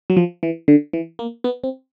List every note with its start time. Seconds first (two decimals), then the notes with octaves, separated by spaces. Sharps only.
0.10 F#3
0.17 F3
0.43 E3
0.68 D3
0.93 E3
1.19 A#3
1.44 B3
1.64 C4